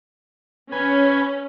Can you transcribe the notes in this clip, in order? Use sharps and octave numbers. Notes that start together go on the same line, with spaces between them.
C#4 B4 G#5